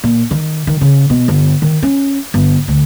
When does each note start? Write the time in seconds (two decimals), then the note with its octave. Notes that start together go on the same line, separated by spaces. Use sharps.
0.04 A#2
0.31 D#3
0.67 D#3
0.81 C#3
1.10 B2
1.28 G1
1.62 D#3
1.83 C#4
2.34 G1
2.68 D2